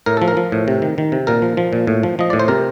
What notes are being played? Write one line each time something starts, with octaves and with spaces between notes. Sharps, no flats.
A2 A#4
F3 A4
A#4
F3
A2
C3
D#3
D#3
C3
A#2 A#4
F3
F3
A#2
A2
F3
F3 D#5
A2 D5
C5
C3 A#4